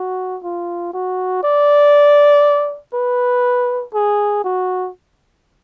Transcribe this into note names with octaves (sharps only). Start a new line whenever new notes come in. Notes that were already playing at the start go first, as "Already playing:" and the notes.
Already playing: F#4
F4
F#4
D5
B4
G#4
F#4